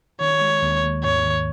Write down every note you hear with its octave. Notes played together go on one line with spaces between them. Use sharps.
D#3 C#5
G#3
D#2
D#2
G#2 C#5
D#3